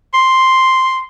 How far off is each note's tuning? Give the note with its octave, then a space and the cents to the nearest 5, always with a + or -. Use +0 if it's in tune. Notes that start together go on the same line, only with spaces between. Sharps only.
C6 +0